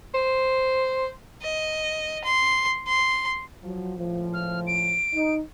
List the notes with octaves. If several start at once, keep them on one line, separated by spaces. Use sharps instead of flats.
C5
D#5
C6
C6
F3 F#3
C#2 A2 F3
F6
D7
D#4